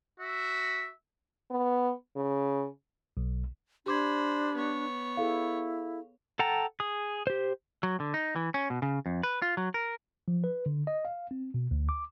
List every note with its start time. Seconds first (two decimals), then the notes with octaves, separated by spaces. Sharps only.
0.20 F#4 E5
1.51 B3
2.16 C#3
3.17 B1
3.86 D4 G4 C5 B5 D6 G#6
4.55 B3 C#5
5.17 E4 G#4 A4 F5
6.39 A4 F#5 G5 A5 A#5
6.80 G#4 D#6
7.27 G4 C5
7.83 F#3
8.00 D3
8.14 D#4
8.36 E3
8.54 C#4
8.70 B2
8.82 C#3
9.06 F2
9.23 B4
9.42 F4
9.57 F#3
9.74 A#4
10.28 F3
10.44 B4
10.66 D3
10.87 D#5
11.05 F5
11.31 C4
11.54 B2
11.71 D2
11.89 D6